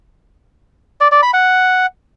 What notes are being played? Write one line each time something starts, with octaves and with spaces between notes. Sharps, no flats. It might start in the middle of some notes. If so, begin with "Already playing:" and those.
D5
D5
B5
F#5